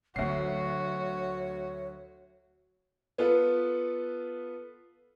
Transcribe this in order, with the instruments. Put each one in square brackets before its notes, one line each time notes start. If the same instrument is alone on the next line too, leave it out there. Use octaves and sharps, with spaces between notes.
[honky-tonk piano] D2 C7 [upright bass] D3 F#3 [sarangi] F#4 [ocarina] C#5
[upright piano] B3 F4 A4 B4